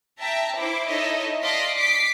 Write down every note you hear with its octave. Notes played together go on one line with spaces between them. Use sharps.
E5 G5 A5 A#5
E4 C5 E5 D6
D#4 E4 A4 C#5 D#5 E5
D5 D#5 F5 A5 C6 B6
D6 B6 C7 D7